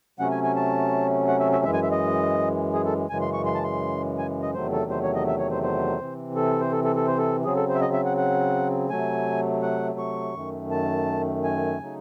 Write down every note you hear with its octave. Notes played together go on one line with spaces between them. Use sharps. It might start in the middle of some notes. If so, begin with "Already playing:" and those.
C3 F#3 A3 C#4 F#5
G#5
G#5
A5
F#5
E5
E5
F#2 E3 G#3 E5
G#5
E5
D#5
G#4
A4
F#2 C#3 E3 G#3 G#5
C6
C#6
C6
A5
C6
G#5
D#5
E2 C3 D#3 F#3 A3 C5
A4
C5
C#5
D#5
E5
C#5
C5
C5
C3 E3 C4
A4
C5
A4
A4
A4
C5
A4
C#3 F#3 C4 G#4
A4
C5
E5
D#5
E5
F#5
F#5
C3 F#3 A3 G#5
F#5
C#6
F#2 D#3 A3
A5
G#5
C#3 F#3 A3 D#4